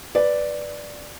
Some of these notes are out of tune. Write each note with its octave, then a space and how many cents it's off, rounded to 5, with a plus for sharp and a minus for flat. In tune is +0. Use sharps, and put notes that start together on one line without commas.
B4 +0 D5 +0